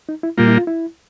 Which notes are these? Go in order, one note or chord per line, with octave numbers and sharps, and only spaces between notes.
D#4
E4
A#2 G3 A#3 F4
E4
F4
E4